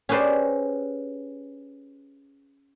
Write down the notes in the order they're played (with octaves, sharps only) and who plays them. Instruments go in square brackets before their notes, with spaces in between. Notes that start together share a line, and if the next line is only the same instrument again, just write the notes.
[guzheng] C#4 G4 G#4 B4 C5 D5